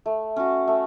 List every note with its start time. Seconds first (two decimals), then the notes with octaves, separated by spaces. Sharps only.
0.06 A3
0.36 C#4 F#4
0.68 A3